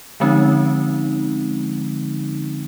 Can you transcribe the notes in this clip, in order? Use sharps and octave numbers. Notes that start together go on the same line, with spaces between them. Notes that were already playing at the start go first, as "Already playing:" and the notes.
D3 F3 G#3 C4 C#4 D#4